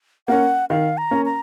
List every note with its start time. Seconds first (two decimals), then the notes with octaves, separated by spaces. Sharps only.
0.28 A#3 C#4 F#5
0.70 D#3 F5
0.98 A#5
1.11 A#3 C#4
1.25 A#5